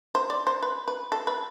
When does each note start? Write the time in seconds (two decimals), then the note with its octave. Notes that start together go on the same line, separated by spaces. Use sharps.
0.15 C5
0.30 D5
0.47 C5
0.63 B4
0.88 B4
1.12 A4
1.27 B4